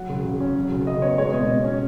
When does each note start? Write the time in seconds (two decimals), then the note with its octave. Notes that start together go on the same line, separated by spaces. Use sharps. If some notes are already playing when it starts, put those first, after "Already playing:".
Already playing: F#3 F#5
0.09 C#3
0.25 C#3
0.40 C#4
0.56 F#3
0.72 C#3
0.87 C#3 D#5
1.02 B3 C#5
1.18 G#3 C#5
1.34 B2 D#5
1.49 B2
1.64 C#4